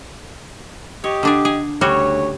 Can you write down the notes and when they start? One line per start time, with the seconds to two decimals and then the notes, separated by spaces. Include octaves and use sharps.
1.04 G4 C#5 D#5
1.23 D3 D4 G#4
1.45 G#4
1.81 D2 C#3 G3 F#4 C#5